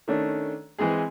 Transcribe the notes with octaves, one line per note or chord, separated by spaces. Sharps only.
D#3 A3 C#4 D4
E3 G#3 C4 G#4